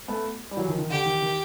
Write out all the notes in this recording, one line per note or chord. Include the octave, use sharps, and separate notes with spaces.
A3 B3
G3
E3 F#3
D#3 F3
D#3
D3 G4
D#3
D#3